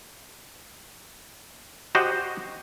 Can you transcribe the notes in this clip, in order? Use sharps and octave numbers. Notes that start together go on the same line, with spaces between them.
F#4 G4 C5 D#5